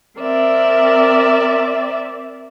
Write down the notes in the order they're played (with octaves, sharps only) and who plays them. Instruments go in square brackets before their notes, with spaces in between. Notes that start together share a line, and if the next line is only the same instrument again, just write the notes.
[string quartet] C4 A#4 D5 E5